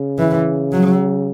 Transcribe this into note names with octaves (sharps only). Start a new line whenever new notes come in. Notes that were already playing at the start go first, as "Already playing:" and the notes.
Already playing: C#3
E3
F#3